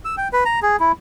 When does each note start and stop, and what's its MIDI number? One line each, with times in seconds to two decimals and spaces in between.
0.05 0.16 88
0.17 0.28 79
0.33 0.44 71
0.45 0.60 82
0.62 0.76 68
0.80 0.92 64